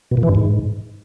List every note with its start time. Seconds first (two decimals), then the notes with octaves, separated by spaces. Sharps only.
0.11 B2
0.17 A#2
0.23 E3
0.29 G2
0.35 G#2